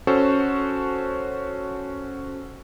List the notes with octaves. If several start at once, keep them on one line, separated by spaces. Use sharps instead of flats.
C#4 F#4 A4 C5